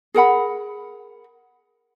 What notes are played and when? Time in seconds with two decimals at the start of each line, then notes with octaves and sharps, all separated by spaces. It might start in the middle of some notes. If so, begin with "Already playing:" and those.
0.14 G#4 A#4 F#5 B5